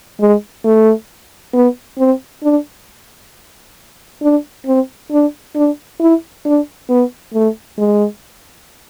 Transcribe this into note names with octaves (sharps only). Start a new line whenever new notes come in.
G#3
A3
B3
C4
D4
D4
C4
D4
D4
E4
D4
B3
A3
G#3